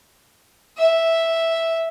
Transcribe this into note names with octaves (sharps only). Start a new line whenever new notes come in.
E5